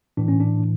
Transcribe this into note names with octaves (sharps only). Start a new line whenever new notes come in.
A2 E3 D4
C#4
D4